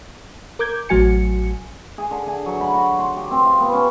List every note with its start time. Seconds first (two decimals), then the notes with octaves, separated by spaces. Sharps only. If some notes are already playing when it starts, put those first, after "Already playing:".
0.59 A#4 D6 G6 G#6
0.89 A1 A2 F#3 F#4 G#5 C#7
1.98 G#4
2.11 D3
2.28 G#5
2.46 F#3
2.61 B5
2.73 F#4
2.99 C6
3.17 G4
3.31 C4
3.46 F4
3.60 B3
3.73 C#4